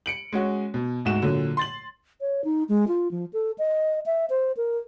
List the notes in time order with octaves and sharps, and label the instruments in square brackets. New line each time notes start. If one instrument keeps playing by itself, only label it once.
[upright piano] C#7 D7 F#7
G#3 C#4 F#4
B2
D2 G#2 F#4 E7
A#2 D3 F#3
C6 A6 F#7
[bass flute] C#5
D#4
G#3
F4
F3
A4
D#5
E5
C5
A#4